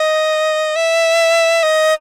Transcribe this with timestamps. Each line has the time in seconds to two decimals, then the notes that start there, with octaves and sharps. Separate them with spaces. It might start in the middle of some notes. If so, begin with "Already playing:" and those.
Already playing: D#5
0.76 E5
1.63 D#5